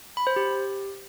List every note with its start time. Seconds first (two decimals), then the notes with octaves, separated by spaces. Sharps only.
0.17 B5
0.27 C5
0.36 G4